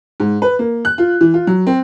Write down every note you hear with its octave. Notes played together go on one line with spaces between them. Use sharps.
G#2
B4
A#3
F#6
F4
E3
F4
F#3
C4